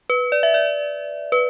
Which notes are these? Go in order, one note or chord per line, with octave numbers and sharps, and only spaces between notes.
B4
D5
E5
D5
B4